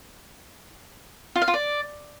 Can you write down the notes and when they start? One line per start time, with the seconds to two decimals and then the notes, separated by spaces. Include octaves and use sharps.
1.36 F4
1.42 F5
1.48 F4
1.54 D5